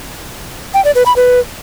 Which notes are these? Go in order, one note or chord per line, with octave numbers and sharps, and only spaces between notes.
G5
D5
B4
B5
B4